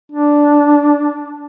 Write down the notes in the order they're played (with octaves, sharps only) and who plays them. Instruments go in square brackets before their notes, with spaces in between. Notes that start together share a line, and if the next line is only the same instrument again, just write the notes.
[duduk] D4